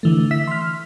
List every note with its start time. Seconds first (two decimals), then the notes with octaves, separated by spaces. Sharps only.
0.03 D3 E3 A3
0.31 E5 E6 B6
0.47 C6 F6